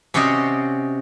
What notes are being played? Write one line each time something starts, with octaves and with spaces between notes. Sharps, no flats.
C3 C#4 F#4 C5 D5 D#5